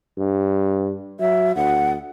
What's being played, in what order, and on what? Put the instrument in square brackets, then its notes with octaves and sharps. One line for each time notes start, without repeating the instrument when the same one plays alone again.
[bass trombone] G2
[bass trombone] F#3 [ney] E5
[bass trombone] D2 [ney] F#5